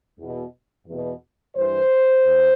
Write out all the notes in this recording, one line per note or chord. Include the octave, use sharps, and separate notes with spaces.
E2 B2
E2 B2
G2 E3 C5
E2